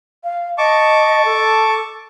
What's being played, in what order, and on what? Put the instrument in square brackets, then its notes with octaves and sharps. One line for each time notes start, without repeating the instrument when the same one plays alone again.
[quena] F5
[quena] D#5 [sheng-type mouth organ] A5 C#6 D6
[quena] A4